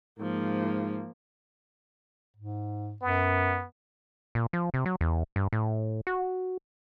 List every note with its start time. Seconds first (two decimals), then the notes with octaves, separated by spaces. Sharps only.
0.19 G#2 F3 A#3
2.37 G#2
3.02 F#2 B3
4.35 A#2
4.53 F3
4.74 C3
4.86 F#3
5.01 E2
5.36 G2
5.53 A2
6.07 F#4